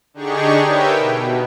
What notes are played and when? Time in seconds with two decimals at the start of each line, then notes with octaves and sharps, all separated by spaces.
0.14 D3 D4 D#4 G4 G#4 C#6
0.65 G4 A#4 B4 C#5 E5 G5
0.98 B2